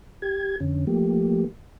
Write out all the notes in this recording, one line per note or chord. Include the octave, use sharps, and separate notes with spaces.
G4 G#6
F2 D3 C#4
F3 A3 A#3 G4